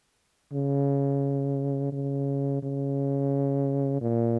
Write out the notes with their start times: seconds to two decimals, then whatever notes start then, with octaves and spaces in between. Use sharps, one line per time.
0.53 C#3
1.92 C#3
2.62 C#3
4.01 A#2